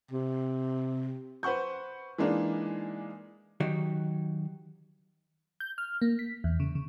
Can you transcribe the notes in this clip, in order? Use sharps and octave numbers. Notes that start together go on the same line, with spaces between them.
C3
B4 C5 F#5 C#6 G6
E3 G#3 A#3 D4 D#4
D#3 F#3 D#4 F#4 G4
G6
F6
A#3
B6
E2
C#3
C#3